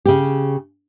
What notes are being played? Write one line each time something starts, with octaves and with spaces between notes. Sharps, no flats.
C#3 G4